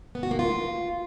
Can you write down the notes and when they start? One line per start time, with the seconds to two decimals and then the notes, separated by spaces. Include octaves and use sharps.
0.15 B3
0.23 F#4
0.31 A#3
0.39 F4